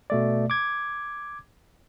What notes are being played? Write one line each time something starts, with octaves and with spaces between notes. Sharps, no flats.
B2 A3 D5
D6 G#6